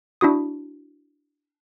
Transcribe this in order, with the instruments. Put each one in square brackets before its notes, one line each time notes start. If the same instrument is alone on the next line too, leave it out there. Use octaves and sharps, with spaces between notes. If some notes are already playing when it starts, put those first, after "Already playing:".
[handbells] D4 E4 F#4 D#6